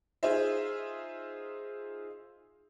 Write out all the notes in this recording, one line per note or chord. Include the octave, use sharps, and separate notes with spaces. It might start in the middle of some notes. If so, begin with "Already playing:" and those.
D#4 F4 G#4 C5 E5